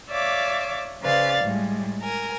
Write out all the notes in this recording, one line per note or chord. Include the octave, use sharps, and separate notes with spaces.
C#5 D5 E5 F5 D6
C#3 B4 C5 D5 F5 A6
A2 G3 G#3
A#4 G#5